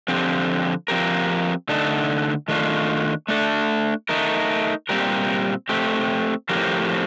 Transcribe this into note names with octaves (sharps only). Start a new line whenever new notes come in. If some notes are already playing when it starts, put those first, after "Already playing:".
D3 F3 C4 G4
F3 C4 G4 A#4
D3 A3 D#4 A4
D#3 A3 D4 F4
A3 D4 A4
A3 D#4 A#4
A#2 G3 C4 G4 A#4
A3 C4 G4
A2 F3 C4 G4 A#4